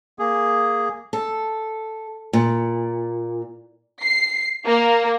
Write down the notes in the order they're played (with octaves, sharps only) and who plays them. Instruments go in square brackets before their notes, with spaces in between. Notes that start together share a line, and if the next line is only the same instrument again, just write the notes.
[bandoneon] A#3 G#4
[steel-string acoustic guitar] A4
A#2
[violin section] C7
A#3